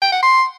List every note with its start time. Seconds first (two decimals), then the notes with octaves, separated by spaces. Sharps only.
0.02 G5
0.12 F#5
0.23 C6